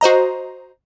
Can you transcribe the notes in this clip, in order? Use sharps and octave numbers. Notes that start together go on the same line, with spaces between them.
F#4 C5 D#5 A#5